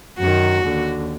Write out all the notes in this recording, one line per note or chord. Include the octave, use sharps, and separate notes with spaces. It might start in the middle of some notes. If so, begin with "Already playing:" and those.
F#2 D#3 F#4
D#2 D3